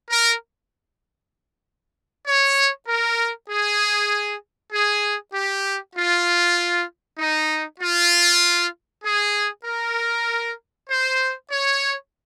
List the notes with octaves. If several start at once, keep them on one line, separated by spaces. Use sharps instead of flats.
A#4
C#5
A#4
G#4
G#4
G4
F4
D#4
F4
G#4
A#4
C5
C#5